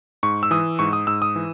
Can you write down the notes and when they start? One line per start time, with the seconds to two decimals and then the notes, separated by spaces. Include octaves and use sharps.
0.23 G#2 C#6
0.43 E6
0.51 E3 D#6
0.79 G#2 C#6
0.93 D#6
1.07 G#2 E6
1.22 D#6
1.36 E3